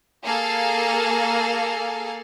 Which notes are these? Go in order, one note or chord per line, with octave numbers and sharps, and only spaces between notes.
A#3 G#4 A4 F5